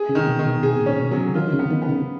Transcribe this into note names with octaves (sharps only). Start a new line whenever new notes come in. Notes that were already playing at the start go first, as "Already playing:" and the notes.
Already playing: G#4
C#3
D#3
C#3
B2
D#3
B2
B2 G#4
A#2
C#4
B2
C#3 F#3
D#3 F4
C#3
B3
D#3
B3
C#3